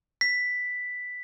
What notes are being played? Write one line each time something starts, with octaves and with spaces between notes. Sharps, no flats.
B6